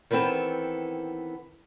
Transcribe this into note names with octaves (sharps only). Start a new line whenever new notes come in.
D#3 E3 B3 C4 A4